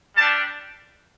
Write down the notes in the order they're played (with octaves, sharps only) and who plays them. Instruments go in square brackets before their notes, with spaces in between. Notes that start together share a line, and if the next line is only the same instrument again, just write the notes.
[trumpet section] G3 D4 G4 A5